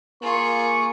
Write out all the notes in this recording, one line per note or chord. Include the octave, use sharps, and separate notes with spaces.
A#3 F4 G#4 C#6